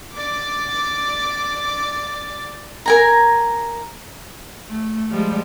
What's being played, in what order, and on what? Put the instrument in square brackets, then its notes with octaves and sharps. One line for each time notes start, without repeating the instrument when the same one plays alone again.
[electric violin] D5 D6
[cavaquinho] A#4 G#5 A#5
[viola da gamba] A3
F3 G3 G#3